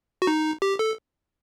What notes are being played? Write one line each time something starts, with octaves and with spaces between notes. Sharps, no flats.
F#4
D#4
G4
A4